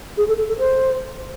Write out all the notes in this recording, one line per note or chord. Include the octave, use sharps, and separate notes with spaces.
G#4
A4
A4
A4
C5